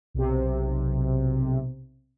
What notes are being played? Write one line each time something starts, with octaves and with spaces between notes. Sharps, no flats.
B1 C3